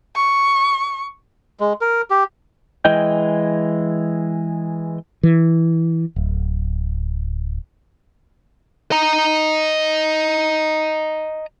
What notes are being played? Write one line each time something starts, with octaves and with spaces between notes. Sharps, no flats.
C#6
G#3
A#4
G4
E3 G#3 D#5 G5 G6
E3
D1
D#5 A#5